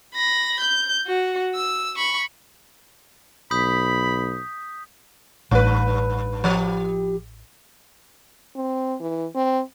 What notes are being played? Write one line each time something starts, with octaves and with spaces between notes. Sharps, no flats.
B5 A#6
G6
F#4
E6
B5 C#6
B1 B5 D#6 G6 B6
A1 G2 B4
F3 G4
C4
E3
C4